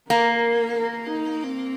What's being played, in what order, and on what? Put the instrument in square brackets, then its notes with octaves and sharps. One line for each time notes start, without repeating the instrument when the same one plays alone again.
[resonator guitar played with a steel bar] A#3 [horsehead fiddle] A#4
[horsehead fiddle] A#4
D#4
C4